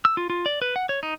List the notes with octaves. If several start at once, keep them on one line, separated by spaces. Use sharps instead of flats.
E6
F4
F4
D5
B4
F#5
C#5
D#4